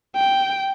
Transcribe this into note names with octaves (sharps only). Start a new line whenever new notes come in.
G5